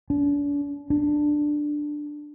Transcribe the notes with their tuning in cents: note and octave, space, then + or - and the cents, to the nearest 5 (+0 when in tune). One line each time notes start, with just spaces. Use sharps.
D4 -40
D4 +10